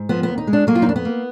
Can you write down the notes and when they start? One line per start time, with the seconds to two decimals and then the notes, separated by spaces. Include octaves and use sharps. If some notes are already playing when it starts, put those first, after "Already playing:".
Already playing: G#2
0.09 F3 B3
0.23 D#2 B3
0.38 D#4
0.47 G#3
0.53 D4
0.67 F#3 A#3
0.75 F4
0.82 D#4
0.86 F2 D4
0.96 B3
1.05 A#3